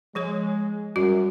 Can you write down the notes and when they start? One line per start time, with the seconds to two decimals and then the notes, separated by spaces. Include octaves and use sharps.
0.15 F3 G#3 G#4 C#5
0.96 F#2 G3 F#4